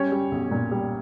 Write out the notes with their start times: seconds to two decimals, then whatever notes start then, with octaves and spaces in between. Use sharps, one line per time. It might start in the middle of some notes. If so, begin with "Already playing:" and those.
Already playing: G3 C#4 C#5
0.12 G3
0.31 B1
0.51 A#2
0.71 G3